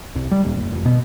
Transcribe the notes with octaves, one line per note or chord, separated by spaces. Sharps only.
C2
G3
D#1
F#1
F1
B2